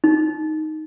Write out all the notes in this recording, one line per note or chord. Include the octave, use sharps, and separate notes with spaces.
D#4